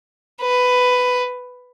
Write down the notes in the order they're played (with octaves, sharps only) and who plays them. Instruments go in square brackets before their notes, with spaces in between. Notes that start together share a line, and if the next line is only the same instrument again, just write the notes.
[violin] B4